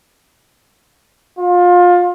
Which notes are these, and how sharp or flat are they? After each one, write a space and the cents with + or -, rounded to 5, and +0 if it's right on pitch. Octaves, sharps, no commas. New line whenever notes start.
F4 +25